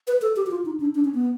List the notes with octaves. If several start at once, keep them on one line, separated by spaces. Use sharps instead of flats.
B4
A4
G4
F#4
F4
D#4
D4
D4
C#4
B3